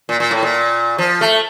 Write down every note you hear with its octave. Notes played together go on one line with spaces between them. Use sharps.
A#2
A#2
A2
A#2
F3
A3